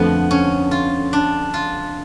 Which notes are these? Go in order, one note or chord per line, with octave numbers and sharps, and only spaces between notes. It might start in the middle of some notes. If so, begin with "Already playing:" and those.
Already playing: F2 D3 F3 A3 B3
C#4
F4
D4
F4